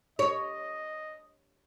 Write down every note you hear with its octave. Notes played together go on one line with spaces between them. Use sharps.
C#5 D#5